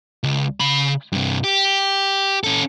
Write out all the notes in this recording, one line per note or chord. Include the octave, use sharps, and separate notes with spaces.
C#2
C#3 B5
G2 C3
G4
C#4 A4